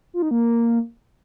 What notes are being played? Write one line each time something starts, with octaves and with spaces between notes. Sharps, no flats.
F4
D#4
A#3